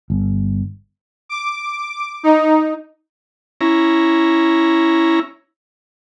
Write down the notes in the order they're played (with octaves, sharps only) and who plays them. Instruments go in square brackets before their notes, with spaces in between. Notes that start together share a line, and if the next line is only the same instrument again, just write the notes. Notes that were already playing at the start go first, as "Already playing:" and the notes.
[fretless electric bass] G1
[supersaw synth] D6
D#4
[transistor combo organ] C#4 E4 A#5